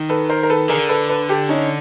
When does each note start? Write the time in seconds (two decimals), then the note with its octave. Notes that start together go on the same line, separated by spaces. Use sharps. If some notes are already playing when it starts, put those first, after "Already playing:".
Already playing: D#3
0.09 A4 B4
0.30 A#4 C5
0.43 A#4
0.50 A4 B4
0.69 D3 G#4 A#4
0.89 A4 B4
1.09 A4 B4
1.29 G4 A4
1.49 C#4 D#4